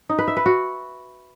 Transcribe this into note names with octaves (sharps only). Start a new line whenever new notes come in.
D#4
B4
E5
B4
F#4